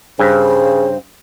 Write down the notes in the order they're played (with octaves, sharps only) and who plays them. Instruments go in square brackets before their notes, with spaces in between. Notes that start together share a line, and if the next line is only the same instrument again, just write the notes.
[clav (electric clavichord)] G2 [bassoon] C#3 [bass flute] C5